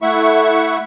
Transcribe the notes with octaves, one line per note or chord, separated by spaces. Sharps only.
A3 E4 E5 F#5 C#6